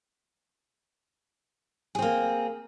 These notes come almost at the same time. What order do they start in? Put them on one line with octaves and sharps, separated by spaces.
G#4 C4 A#3